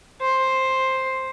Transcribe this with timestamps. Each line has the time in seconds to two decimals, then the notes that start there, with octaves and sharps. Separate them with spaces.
0.21 C5